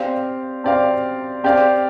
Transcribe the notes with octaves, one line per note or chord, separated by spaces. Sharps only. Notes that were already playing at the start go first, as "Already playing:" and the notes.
Already playing: C4 G4 D5 F5
C4 G4 D5 F5
C4 G4 D5 F5